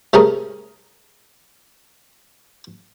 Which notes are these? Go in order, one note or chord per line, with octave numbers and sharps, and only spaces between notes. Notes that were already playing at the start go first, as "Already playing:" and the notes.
C3 A3 C#4 G#4 A#4